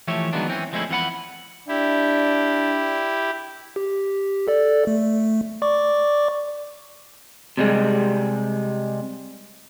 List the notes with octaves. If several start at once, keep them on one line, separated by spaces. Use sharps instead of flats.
E3 F3 A3 G4 C#5 E5
D#3 E3 F#3 G#3 B3 D4
E3 C4 C#4
F3 G#3 A3 C4 C#4 E4
F2 E3 C#4 F#5 B5
D4 E4 G4
G4
A4 D5
A3
D5 C#6 D6
C3 G3 G#3